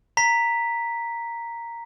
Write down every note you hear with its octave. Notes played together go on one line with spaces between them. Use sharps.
A#5 B6